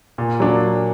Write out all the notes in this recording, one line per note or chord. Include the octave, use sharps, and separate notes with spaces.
A#2
F#3 A#3 D4